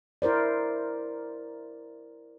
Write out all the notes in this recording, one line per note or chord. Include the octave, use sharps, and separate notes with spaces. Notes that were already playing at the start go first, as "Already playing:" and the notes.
E4 A#4 C5 D5